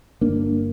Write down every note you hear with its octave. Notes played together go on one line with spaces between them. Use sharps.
G1 A#3 D4